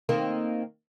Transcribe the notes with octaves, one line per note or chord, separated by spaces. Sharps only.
D#3 A#3 C4